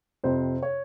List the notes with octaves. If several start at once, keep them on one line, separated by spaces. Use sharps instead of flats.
F2 C3 C5
C#5